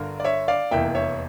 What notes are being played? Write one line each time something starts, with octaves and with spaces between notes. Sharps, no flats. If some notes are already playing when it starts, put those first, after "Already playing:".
Already playing: G1 G2 D3 A#4
D5
C#5 E5
D5 F5
F1 E2 E3 A#3 E5 G5
C#5 E5